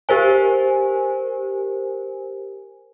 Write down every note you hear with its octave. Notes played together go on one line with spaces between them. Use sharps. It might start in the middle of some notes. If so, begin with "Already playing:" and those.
G4 A#4 C5 G#5